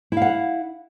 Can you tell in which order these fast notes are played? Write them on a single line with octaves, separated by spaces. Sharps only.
E4 F5 F#5